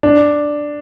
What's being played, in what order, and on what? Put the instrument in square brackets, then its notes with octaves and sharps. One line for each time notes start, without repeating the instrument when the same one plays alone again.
[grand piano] D4